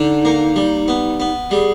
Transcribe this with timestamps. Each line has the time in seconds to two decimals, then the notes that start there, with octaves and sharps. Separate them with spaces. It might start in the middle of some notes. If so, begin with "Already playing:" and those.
Already playing: D3 D#4
0.25 A#3
0.56 G3
0.88 B3
1.20 B3
1.51 G3 G#4